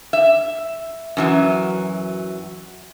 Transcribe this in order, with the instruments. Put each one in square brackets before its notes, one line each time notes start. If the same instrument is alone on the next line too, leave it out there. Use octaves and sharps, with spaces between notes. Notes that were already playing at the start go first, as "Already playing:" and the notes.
[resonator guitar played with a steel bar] E5
F#2 E3 F#3